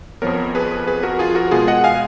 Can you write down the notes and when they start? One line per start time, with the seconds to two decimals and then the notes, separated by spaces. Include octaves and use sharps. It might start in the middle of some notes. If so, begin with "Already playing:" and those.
0.22 F2 F3 B3 A#4 C#5
0.55 G#4 B4
0.87 G#4 B4
1.03 F#4 A#4
1.19 F4 G#4
1.35 F#4 A#4
1.51 B2 G#3 B3 F4 G#4
1.68 D#5 F#5
1.84 F5 G#5